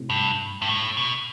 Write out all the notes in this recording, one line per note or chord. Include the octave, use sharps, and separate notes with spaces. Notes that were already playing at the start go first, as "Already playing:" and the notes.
Already playing: A2 C3
G2
G2
A2
B2